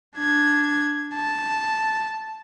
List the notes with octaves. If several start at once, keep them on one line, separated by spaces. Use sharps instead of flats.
D4 G#6
A5